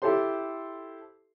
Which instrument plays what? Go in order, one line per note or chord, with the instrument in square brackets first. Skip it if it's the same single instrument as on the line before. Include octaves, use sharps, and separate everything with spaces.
[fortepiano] E4 G4 A4 C5 C6